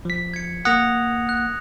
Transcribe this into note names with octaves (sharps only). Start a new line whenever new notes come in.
F3 B6
G#6 C#7
A#3 F#5 D#6 A#6 F7
F#6